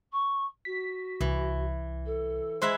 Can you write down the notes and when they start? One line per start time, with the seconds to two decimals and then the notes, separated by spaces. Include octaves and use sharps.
0.12 C#6
0.65 F#4 B6
1.21 C2 E3
2.05 A4
2.62 G#3 E4 C5 E5 C6 F#6